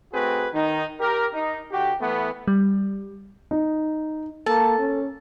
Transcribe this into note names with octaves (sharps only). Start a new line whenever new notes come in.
A3 C4 F#4 G#4 B4
D#3 D#4
G4 A#4
D#4
D3 F#4 G4
E3 A3 B3
G3
D#4
A#3 A4 A5
C#4